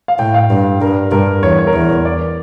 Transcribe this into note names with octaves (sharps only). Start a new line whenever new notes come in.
F5
A2 G5
F5
G2
G2 A#4
G2 A#4
E2 C#5
C#5
A#4
E2 C#5
D5